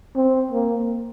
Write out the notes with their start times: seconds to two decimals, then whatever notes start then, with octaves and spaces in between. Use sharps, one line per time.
0.16 C4
0.51 A#3